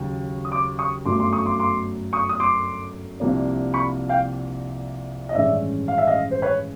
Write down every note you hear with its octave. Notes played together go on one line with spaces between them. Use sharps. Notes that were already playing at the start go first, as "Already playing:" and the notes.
Already playing: D#2 C#3 F#3
D#6
C6 D6
C#6 D#6
G1 F#2 D3 F#3 A3 C6 D6
C6 D6
C#6 D#6
C6 D6
C6 D6
C#6 D#6
D#6
C6 D6
C2 C3 F3 A#3 D4
B5 C#6
F5 G5
D#5
A1 G2 D#3 G#3 C#4 D5 E5
F5
E5
D#5 F5
C5
B4 C#5